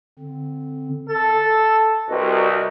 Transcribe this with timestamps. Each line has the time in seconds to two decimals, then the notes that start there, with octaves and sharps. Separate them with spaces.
0.19 D3 C4
1.09 A4 A6
2.09 C2 F#4 B4 D#5